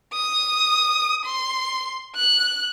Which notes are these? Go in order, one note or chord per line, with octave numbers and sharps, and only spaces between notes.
D#6
C6
F#6